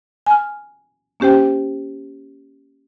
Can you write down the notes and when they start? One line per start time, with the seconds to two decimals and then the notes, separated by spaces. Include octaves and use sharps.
0.26 G#5 F6
1.20 A#3 C#4 G4 C5 G5